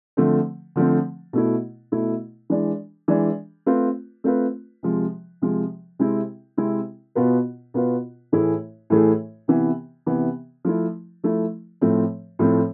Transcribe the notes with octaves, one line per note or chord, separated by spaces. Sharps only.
D3 F3 A3 C4
D3 F3 A3 C4
B2 A3 E4
B2 A3 E4
E3 G#3 D4
E3 G#3 D4
A3 C4 F4 B4
A3 C4 F4 B4
C3 F3 G#3
C3 F3 G#3
C3 G#3 C4 E4
C3 G#3 C4 E4
B2 B3 F4 B4
B2 B3 F4 B4
A2 E3 A3 E4 G#4
A2 E3 A3 E4 G#4
C3 E3 B3
C3 E3 B3
F3 A3 E4
F3 A3 E4
A2 F3 A3 C4
A2 F3 A3 C4